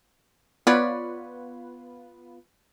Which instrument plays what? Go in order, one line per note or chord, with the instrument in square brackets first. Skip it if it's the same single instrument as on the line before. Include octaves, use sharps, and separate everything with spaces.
[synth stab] B3 F4 B4 [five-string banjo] C#5 D5